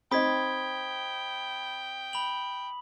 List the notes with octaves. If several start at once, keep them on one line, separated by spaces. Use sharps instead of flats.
C4 D#4 G5 B5 D#6 G#6 B6
B5 F#7